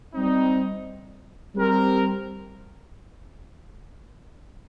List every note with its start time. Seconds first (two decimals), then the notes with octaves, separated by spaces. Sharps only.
0.14 G3 C4 D#4
1.55 G3 C4 G4 A#4